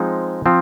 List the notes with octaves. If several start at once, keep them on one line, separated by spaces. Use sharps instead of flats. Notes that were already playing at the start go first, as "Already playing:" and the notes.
Already playing: F3 G#3 C4 D#4
F3 C4